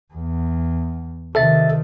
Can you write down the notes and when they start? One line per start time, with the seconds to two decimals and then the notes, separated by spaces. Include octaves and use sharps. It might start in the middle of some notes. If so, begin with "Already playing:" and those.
0.14 E2
1.35 C3 D#3 A4 E5 A6